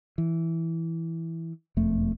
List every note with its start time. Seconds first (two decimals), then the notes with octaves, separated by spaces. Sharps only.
0.18 E3
1.77 E1 F2 A3